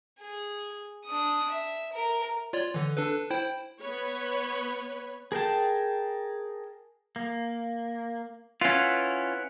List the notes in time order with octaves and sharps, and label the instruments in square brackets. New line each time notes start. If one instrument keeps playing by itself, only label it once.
[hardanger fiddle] G#4
D4 D#6
E5
A#4
[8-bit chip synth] F4 C#5 D5
D3 E3
D4 A4 B4
E4 C5 G5
[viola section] B3 B4 C#5
[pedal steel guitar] G#4 A#4 G5 A5
A#3
[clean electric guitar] C#4 F4 [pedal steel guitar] E4 B4 F#5